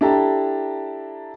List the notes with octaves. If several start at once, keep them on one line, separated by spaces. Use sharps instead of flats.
D4 E4 G4 A4 A5 A#5